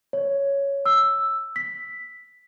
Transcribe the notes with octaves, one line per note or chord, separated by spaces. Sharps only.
C#5
E6
B6